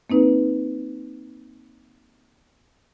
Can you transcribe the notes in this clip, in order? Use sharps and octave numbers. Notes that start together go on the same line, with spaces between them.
A#3 C4 D#4 B4